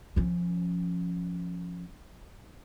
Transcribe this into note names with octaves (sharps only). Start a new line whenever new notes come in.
F3 C#4